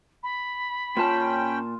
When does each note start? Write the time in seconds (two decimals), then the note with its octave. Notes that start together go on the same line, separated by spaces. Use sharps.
0.23 B5
0.97 A#2 C#4 F4 G5 A5